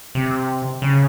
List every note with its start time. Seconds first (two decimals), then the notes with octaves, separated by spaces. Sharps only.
0.15 C3
0.82 C#3